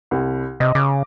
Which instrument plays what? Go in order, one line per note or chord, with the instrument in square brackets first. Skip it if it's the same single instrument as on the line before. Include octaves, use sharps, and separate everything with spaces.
[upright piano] C2
[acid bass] C3 [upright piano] D#5
[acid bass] C#3 [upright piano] D6